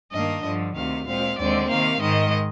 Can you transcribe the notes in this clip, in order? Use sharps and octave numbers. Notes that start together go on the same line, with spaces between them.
G2 D#3 A#3 D4 D#5
G2 D3 F3
D2 C3 D#3 F5
A#2 G#3 C4 F5
D#2 D3 G#3 C4 D5
C3 D#3 A#3 F5
G#2 D#3 G#3 D#5